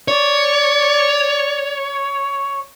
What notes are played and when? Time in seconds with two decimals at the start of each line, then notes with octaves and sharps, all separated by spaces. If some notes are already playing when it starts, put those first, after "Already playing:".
0.08 C#5 D5